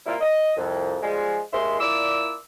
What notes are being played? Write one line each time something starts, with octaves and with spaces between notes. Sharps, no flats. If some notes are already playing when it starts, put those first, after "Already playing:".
C3 G3 A#3 E4 F4
D#5
C2 F2
F3 G3 G#3
D#2 D#3 G#3 E5 C6
A#2 E4 D5 D6 E6